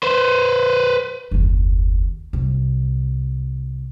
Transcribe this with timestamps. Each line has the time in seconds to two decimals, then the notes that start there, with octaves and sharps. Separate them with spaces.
0.03 B4 C5
1.31 F#1 D#2
2.33 C2